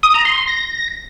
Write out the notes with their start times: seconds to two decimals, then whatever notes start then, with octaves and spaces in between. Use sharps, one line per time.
0.03 D#6
0.14 A#5
0.25 C6
0.36 C6
0.47 A#6